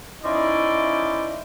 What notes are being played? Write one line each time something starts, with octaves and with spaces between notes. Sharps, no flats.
C#4 D#4 E4 C5 D5 D#5